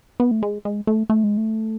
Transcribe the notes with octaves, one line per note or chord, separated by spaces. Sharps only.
B3
A3
G#3
G#3
A3
A3
G#3
A3